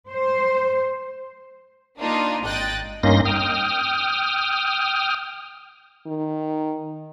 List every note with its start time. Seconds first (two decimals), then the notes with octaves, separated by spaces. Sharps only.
0.10 C5
1.99 A#3 D4 D#4 F4
2.45 G#1 D#5 G5 F#6 A6
3.03 G2 A#3 C#4 D#4 C6 A#6
3.25 G5 D#6 F6
6.06 D#3